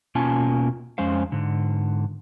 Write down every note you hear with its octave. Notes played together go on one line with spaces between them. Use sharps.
B2 A#3 C#4 F4 G#5 A5
F2 G#3 C#4 C5 F5
G#2 D3